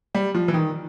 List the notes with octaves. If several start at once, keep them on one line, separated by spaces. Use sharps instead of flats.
G3
F3
E3
D#3